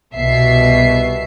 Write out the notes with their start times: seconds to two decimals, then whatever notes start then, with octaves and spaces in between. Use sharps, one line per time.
0.14 C2 B2 E5 C7